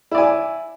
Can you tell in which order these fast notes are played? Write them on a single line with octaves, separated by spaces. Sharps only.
E4 D5 G#5